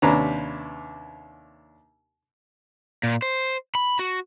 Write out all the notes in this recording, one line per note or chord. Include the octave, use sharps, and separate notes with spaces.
D#2 C3 C#4 D4 B4 A#5
A#2
C5
B5
F#4